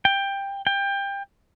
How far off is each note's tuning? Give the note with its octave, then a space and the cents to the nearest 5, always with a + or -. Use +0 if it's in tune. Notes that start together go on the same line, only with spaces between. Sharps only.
G5 +15
G5 +25